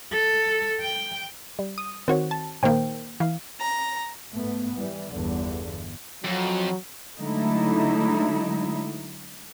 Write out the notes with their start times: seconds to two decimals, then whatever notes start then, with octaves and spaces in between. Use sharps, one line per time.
0.12 A4
0.81 G5
1.59 G3
1.78 D#6
2.08 D#3 C4 F#4 C#5
2.31 A5
2.63 A#2 D#3 A#3 C5 G5
3.20 E3 F5
3.60 A#5
4.33 G#2 A3 B3
4.74 E3 G3
5.12 G1 E2 G2 D3
6.24 F2 F#3
7.17 D3 F#3 G#3 A3 D#4 E4